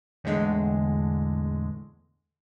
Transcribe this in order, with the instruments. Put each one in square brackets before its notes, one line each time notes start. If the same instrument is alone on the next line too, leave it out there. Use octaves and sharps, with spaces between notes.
[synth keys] E2 A2 D3 G#3